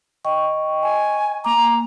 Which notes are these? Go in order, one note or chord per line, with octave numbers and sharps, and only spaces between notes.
D#5 G5 C#6
G#5
A#3 A#5 D6